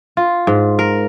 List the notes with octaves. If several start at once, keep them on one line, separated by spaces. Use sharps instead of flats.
F4
G#2
A#4